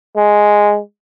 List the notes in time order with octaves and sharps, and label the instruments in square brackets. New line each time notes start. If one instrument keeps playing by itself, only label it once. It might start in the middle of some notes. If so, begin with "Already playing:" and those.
[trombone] G#3